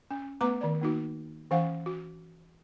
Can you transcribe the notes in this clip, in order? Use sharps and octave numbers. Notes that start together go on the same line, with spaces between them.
C#4
A3 B3 B4 A#5 D6
D#3 D5
A#3 D#4 F#4
E3 C#4 F5 F#5
F#4